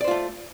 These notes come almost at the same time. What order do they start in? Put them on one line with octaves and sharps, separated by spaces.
D5 C5 F4 A3